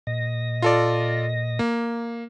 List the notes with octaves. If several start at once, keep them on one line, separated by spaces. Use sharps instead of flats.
A#2 D#5 A#6
F4 A4 D5
A#3